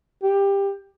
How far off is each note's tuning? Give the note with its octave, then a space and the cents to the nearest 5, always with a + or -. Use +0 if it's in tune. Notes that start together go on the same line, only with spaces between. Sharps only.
G4 +15